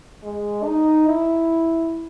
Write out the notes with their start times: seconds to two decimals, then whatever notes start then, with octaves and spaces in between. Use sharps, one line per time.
0.23 G#3
0.65 D#4
1.07 E4